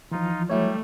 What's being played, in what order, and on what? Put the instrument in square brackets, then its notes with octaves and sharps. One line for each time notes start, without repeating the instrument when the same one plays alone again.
[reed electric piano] E3 F3 [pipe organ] D#4 F4
[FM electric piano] F#3 E4 C#5 [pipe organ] G3 [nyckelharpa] A3